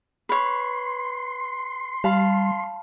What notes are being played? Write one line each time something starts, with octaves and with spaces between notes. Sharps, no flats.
B4 C#5 C6
G3 F5 A5 B5